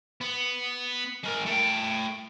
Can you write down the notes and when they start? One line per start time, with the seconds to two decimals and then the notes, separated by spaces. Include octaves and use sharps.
0.21 B3
1.24 G#3 A#4
1.46 A3 G5